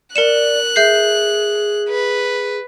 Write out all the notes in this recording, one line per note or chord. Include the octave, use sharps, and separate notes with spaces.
A#4 D5 F#6 C#7 E7
G#4 E5 G6 C7
B4